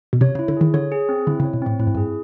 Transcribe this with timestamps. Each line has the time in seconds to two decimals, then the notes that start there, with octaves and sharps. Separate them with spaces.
0.13 B2
0.21 C3 C#5
0.35 C#3
0.39 E4
0.48 D3
0.57 D#3 G#4
0.74 D3 C#5
0.92 G#4
1.09 C4
1.27 D3 E4
1.40 C#3
1.45 C#5
1.53 B2
1.62 A2 C4
1.80 A2 E4
1.87 G#2
1.95 G2
1.97 G#4